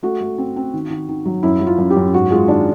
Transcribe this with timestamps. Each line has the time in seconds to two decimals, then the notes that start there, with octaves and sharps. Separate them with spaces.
0.03 A3 F#4
0.21 A3
0.38 C4
0.56 C4
0.74 D#3
0.90 D#3
1.09 D#3
1.25 F#3
1.43 F#2 E4
1.61 F#3
1.67 F4
1.78 F#2
1.90 G4
1.97 F#2
2.13 G#2 F#4
2.31 G#3 F4
2.48 D#3 D4